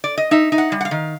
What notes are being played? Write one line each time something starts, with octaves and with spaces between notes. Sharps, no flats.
D5
D#5
D#4 E5
D#4
F#5
G3
F#5
F5
D#3